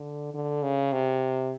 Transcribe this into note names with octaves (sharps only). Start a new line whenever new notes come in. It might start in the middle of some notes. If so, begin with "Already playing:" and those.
Already playing: D3
D3
C#3
C3